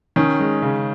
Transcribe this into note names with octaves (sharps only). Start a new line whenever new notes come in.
D#3 C#4
G#3
C#3